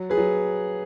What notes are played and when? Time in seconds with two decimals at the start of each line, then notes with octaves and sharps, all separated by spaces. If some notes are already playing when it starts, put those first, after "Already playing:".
Already playing: F#3
0.10 G#4 B4
0.18 F#3